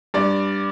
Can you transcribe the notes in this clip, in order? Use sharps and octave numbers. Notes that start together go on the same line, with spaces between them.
G2 D5